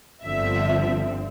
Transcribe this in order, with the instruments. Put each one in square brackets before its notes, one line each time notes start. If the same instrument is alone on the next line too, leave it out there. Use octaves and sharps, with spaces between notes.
[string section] G1 G2 D3 F3 C4 E5